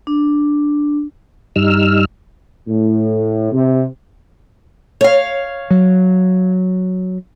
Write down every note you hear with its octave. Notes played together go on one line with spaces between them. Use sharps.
D4
G2 G3 D#4 E6 F6
A2
C3
C#5 F5
F#3